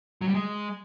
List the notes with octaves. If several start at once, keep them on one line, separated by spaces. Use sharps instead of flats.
F#3
G3
G#3